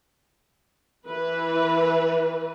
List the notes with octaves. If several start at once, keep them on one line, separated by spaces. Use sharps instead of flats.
E3 B4